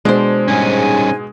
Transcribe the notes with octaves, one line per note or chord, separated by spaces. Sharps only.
B2 G#3 D4 C5
G#2 G3 C#4 G#5